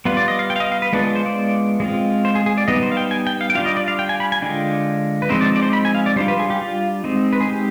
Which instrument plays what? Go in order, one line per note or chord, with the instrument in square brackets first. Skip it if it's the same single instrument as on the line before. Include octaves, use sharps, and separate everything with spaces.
[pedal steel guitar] G3 B3 F4 B4
D5
D#5
F5
G5
F5
D#5
F5
B4
G#3 B3 D4 F4 B4
G#4
C5
D5
G#3 C4 F4
C5
G#4
G#4
D5
G3 B3 D#4 D#5
C5
F5
G5
G#5
G5
F5
G5
G3 D4 F4 F5
D#5
D5
F5
G5
G#5
B5
G#5
D3 G#3 D4 F4 G5
B4
F3 G#3 C4 D#4 C5
D5
D5
C5
B5
G#5
F5
D5
G3 D4 F4 C5
B4
G#4
G4
F4
G#3 C4 D#4
B4
G#4
G4